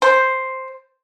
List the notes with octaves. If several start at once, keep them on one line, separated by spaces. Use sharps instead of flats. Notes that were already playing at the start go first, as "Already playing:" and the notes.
C5